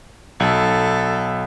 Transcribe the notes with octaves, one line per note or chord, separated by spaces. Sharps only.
B1 A4